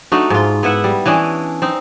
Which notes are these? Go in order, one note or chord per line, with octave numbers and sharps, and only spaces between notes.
A3 D4 D#4 F#4
G#2 F4
B3 E4 E5 F#5
G3
E3 C#4 D4 D#5
C4 D#4